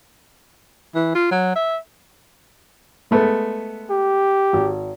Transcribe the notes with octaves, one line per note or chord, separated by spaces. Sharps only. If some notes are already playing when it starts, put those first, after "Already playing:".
E3
F4
F#3
E5
G#3 A3 B3
G4
G#1